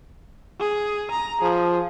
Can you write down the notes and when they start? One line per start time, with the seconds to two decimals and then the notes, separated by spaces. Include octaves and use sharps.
0.60 G#4
1.12 A#5
1.42 F3 G#4